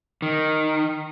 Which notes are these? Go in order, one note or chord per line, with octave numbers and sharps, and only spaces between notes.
D#3